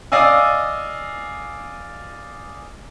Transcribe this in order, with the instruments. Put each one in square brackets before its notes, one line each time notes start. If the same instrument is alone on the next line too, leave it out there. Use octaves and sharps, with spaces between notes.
[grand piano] D5 D#5 F5 G#5 E6